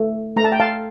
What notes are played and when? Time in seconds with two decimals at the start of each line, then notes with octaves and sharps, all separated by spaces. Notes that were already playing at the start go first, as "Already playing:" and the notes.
Already playing: A3
0.36 A3 A#5
0.44 A5
0.52 G5
0.60 F5 A5